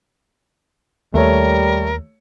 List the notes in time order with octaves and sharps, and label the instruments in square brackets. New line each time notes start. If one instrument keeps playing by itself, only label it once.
[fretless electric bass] D#2 [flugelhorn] G3 [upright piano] A3 C#5 [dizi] A#4